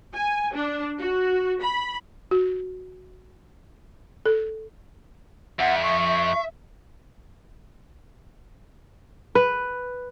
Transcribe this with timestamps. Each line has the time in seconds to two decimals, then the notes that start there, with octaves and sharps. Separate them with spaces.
0.14 G#5
0.54 D4
0.99 F#4
1.62 B5
2.31 F#4
4.26 A4
5.59 F2 E5 F#5
5.83 C#6
9.35 B4